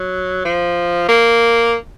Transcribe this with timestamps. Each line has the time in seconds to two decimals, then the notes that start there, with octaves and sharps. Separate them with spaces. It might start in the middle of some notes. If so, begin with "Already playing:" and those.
Already playing: F#3
0.45 F3
1.09 A#3